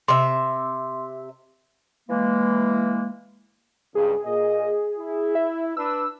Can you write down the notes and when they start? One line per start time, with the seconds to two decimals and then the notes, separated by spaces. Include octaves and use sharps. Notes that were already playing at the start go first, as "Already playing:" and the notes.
0.08 C3 E5 C6
2.10 E3 G#3 A#3
3.95 C#2 G2 G#4
4.25 A#2 D#5
4.97 E4
5.35 E5
5.77 D4 B4 E6